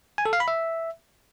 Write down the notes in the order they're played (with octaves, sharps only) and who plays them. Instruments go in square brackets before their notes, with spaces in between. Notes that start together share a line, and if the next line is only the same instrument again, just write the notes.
[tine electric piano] G#5
A4
F5
B5
E5